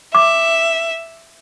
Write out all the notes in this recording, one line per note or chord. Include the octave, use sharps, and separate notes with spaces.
E5 D6